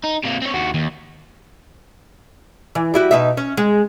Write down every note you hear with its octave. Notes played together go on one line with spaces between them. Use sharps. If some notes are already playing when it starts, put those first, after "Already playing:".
D#4
C3 A#3
C4 C#5
D#2 F#4
D#2
E3
G3 E4 F#4
B2 D#4 E5
C#4
G#3